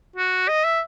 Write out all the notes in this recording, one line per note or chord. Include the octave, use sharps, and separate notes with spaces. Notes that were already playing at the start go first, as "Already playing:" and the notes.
F#4
D#5
E5